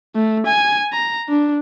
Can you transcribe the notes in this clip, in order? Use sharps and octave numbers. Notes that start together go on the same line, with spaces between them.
A3
G#5
A#5
D4